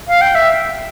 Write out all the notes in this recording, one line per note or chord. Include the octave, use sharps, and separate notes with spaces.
F5
G5
E5